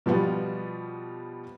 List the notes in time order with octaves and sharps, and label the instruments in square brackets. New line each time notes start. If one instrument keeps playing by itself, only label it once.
[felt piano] B2 F3 G3 B3 F4